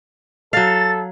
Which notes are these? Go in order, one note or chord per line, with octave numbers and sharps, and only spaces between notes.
F#3 A4 F5 A6